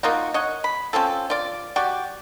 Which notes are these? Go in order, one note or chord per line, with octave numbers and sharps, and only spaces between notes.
A#3 D#4 F4 F#4
C#5 D#5 F#5
B5
C4 C#4 F4 A4
F4 D5
F#4 G4 D5